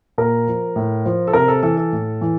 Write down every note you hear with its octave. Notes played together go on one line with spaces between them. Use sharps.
A#2 A#4
F3
A2
F3
A4
C3 A#4
A4
E3 A4
A4
A2
E3